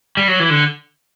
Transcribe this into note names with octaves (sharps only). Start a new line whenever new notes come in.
G3
F#3
E3
D3